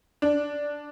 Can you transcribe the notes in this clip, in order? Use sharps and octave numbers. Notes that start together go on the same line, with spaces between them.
D4